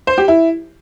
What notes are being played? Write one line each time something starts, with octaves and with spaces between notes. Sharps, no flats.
C5
G4
E4